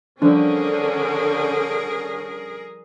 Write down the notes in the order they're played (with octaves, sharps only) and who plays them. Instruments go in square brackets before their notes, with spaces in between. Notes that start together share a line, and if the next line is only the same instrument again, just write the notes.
[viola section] D3 C#4 [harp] F3 G3 E6 [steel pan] D4 [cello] G#4 A#4